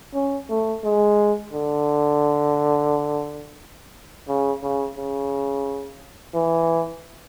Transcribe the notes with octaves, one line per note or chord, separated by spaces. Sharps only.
C#4
A3
G#3
D3
C#3
C#3
C#3
E3